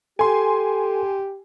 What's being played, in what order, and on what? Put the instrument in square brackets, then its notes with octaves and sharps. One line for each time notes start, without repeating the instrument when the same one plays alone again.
[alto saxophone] G4 [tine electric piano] A4 [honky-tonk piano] G#5 C6